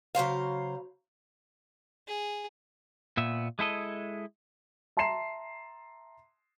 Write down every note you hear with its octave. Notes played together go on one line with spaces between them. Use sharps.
C#3 F#3 C5 F5
G#4
A#2 B3 E5
G#3 E4 A4 D#5
E5 A5 A#5 C6 C7 E7